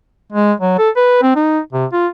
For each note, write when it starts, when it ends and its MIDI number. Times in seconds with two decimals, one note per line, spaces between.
0.33 0.53 56
0.60 0.76 54
0.79 0.90 69
0.97 1.22 71
1.22 1.33 60
1.36 1.59 63
1.73 1.86 48
1.93 2.07 65